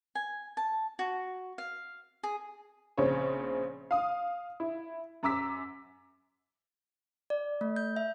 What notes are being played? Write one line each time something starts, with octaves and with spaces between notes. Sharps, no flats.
G#5
A5
F#4
F5
G#4
A#1 C#3 C4 C#5
F5 D#6
E4
F#2 A#5 D6 E6 B6
D5
A3
G6
E5